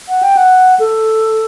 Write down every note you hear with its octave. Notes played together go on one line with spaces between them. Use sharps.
F#5
G5
F#5
A4